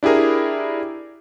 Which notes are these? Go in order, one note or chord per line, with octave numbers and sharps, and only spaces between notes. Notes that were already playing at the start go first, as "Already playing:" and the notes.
D4 E4 G4 G#4 A#4